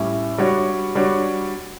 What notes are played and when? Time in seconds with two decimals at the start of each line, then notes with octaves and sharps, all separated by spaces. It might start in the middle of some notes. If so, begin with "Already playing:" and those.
Already playing: A2 G3 C#4 E4
0.38 G3 D4 F#4 C#5
0.95 G3 D4 F#4 C#5